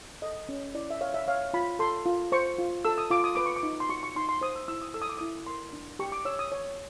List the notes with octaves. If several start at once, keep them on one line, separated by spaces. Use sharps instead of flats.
A4 D#5
C#4
E4 D5
E5
C#5 F5
E5
C#5 F5
F4 B5
A4 C6
F4
C5 C#6
F4
A4 E6
D#6
F4 D6
D#6
B4 D6
C#6
D6
D#4
C6
F#4 C#6
C#6
D#4 C6
C6
C5 D#6
E6
E4 E6
D#6
A4 E6
D#6
D6
E4 D#6
A#4 C6
D4
G4 C#6
D6
C#5 E6
D#6
C#5